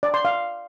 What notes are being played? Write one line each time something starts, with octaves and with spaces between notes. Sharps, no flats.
D5
C6
F5